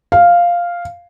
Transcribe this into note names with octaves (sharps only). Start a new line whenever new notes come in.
F5